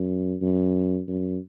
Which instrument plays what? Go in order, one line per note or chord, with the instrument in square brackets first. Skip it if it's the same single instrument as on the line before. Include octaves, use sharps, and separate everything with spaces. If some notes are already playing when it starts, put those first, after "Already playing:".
Already playing: [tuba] F#2
F#2
F#2